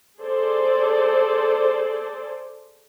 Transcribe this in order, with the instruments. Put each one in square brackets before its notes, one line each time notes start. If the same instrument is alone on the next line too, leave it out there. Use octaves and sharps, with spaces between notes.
[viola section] G#4 A4 C5 D5